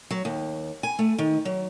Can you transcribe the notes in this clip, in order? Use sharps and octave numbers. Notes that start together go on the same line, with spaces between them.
F#3
D#2
G#5
A3
D#3
F#3